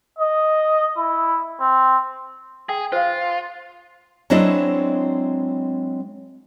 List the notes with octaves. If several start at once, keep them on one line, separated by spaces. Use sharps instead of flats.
D#5
E4
C4
G#4 G5
F4 C5 F5
F#3 G#3 C4 D4 E4 D#5